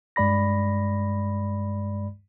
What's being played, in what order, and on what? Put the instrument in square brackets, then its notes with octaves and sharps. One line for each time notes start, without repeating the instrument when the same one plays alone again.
[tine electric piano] G2 G#3 D5 B5 A#6